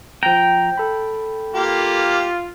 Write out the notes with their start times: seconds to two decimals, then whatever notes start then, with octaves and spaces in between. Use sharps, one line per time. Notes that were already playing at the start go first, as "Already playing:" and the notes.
0.23 F3 G5 A#5
0.78 A4 B5
1.54 A#3 F4 G4